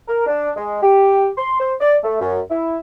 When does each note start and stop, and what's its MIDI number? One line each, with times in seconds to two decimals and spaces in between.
0.08 0.25 70
0.26 0.51 62
0.56 0.81 56
0.83 1.28 67
1.37 1.56 84
1.60 1.73 72
1.80 1.96 74
2.04 2.18 57
2.20 2.40 42
2.50 2.78 64